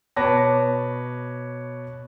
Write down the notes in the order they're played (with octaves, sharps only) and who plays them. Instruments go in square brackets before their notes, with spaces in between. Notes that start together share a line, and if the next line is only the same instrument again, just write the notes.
[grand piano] B2 B4 C#5 A5 D6 A#6